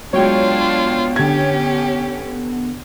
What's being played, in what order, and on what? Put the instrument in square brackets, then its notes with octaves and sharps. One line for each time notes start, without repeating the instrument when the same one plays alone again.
[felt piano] F#3 G#3 [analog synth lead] B3 [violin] D4 F4 [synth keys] C#5 G5
[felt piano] D3 G#6 [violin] C#4 G4